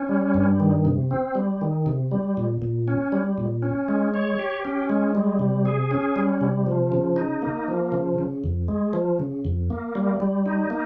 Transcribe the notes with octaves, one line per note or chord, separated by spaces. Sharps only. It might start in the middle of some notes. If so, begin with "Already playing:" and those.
Already playing: C#4
G3
G2
D#3
C3
C4
G3
D#3
C3
G3
A#2
A#2
C#4
G3
A#2
C#4
G#3
C#5
G4
C#4
G#3
G3
C3
G#4
C#4
G3
C3
F3
C#3
D#4
A#3
F3
C#3
C#3
F2
G#3
F3
C#3
F2
A#3
G3
G3
D#4
A#3